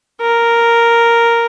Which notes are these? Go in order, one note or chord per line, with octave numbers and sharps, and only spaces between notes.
A#4